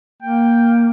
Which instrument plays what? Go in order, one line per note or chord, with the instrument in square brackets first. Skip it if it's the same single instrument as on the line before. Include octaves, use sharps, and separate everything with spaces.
[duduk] A#3 [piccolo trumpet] G5